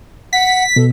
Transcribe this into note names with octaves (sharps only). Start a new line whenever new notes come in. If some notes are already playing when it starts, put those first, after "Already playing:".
F#5 B6
B2 A4